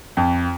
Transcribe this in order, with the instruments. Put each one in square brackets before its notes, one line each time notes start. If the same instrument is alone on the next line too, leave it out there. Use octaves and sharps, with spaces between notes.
[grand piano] F2